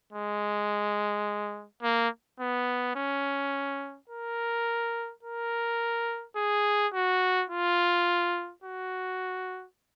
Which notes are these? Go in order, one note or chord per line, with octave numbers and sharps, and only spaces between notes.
G#3
A#3
B3
C#4
A#4
A#4
G#4
F#4
F4
F#4